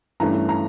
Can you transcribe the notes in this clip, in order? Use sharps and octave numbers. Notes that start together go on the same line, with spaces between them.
G2 E3 A3 C#4 A#5
A#5